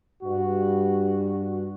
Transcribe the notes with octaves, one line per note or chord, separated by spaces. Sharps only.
G2 F#4